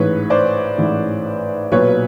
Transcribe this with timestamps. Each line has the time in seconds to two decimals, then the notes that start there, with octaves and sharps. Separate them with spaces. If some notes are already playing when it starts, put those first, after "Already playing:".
Already playing: A1 G#2 E3 B4 C#5
0.30 C5 D5
0.78 A1 G#2 E3
1.72 B1 A#2 F#3 B4 C#5